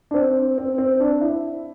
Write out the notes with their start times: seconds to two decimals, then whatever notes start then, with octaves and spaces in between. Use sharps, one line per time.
0.11 D4
0.14 C4
0.58 C4
0.78 C4
1.00 D4
1.21 E4